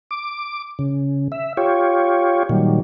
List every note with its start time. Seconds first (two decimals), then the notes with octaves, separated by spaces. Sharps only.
0.11 D6
0.79 C#3
1.32 E5
1.57 F4 G4 C#5
2.49 A#2 D#3 F#3 G3